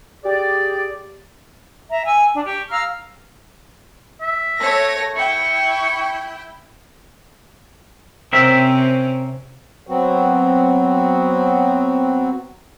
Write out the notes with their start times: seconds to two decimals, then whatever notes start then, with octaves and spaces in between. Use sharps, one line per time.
0.24 G4 G#4 D5
1.90 E5 A#5
2.05 G#5 E6
2.34 D4
2.45 G4 C#6
2.70 F5 A#5 E6 F6
4.21 E5
4.60 A3 C#5 A#6
5.15 E4 G5 C#6
8.33 C3 C4 C#4 A#4 E5
9.87 F#3 B3 C4 F#4